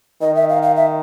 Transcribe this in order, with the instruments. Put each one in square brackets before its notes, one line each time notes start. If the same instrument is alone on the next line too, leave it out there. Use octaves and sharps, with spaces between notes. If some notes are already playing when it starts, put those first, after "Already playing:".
[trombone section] D#3 [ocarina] D#5
[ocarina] E5
F5
F5
E5